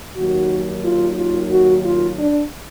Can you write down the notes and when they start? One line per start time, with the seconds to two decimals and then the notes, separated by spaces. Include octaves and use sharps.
0.17 D#2 D#3 F#3 F#4
0.85 F4
1.18 F4
1.51 F#4
1.85 F4
2.19 D4